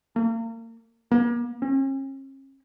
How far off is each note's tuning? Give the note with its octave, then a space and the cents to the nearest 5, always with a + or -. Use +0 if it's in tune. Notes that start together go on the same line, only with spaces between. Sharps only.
A#3 -35
A#3 +40
C#4 -40